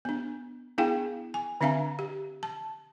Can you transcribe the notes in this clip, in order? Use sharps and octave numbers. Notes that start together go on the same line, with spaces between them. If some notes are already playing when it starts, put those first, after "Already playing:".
B3 D4
B3 D4 E4 G#4 F5 G5
G#5
D3 C4 D4 E5 F5 A#5
G4
A5